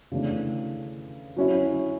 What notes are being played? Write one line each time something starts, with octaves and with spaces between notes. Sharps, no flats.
C#3 E3 A3 D4
F#3 C#4 E4